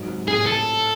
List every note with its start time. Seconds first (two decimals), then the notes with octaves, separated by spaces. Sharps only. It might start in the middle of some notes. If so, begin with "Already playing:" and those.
Already playing: G#2 F#3
0.08 C3
0.27 A2 G#4
0.47 A2 A4
0.67 E4